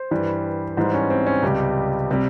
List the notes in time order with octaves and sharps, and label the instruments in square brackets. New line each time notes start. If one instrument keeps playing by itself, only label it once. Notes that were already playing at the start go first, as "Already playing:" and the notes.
Already playing: [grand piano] C5
G2 E3 G3
G#2 E3 G3 C5
C#4
C4
C#4
C#2 C3 G3 G4
C3 G3